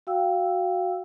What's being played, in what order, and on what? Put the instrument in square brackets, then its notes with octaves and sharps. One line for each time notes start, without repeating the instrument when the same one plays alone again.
[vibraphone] F#4 F5 G5 E6